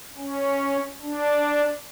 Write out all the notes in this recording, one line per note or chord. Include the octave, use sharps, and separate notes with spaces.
C#4
D4